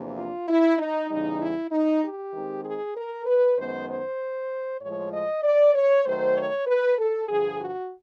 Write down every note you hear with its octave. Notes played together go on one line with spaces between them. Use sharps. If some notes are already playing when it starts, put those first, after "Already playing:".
Already playing: E2 C3 F3 A#3 D4
F4
E4
D#4
E2 C#3 E3 G3 D#4
E4
D#4
G4
D#3 G#3 C4 D#4
G#4
A#4
B4
F#2 D#3 G#3 B3 C5
C5
A2 F3 G#3 C#5
D#5
D5
C#5
D#3 F#3 A3 C5
C#5
B4
A4
G2 D3 F3 G#4
F#4